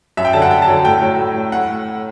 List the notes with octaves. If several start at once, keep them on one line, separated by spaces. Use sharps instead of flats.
F#2 E5
G5
D3 F#3 A5
F#5
F#2 G5
A5
D3 F#3
A2 G5
F#3
A2
F#3
A2 F#5